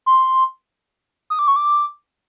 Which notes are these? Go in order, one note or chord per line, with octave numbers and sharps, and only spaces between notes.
C6
D#6
D6
C#6
D6